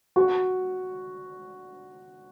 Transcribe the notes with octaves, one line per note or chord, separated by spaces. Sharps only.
F#4